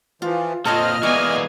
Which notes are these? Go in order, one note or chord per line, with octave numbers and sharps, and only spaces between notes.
E3 F3 F4
A#2 C4 F4 A4 C5 C#5 D#5 F6
E3 G#3 A#3 B3 D5 G#5 C#6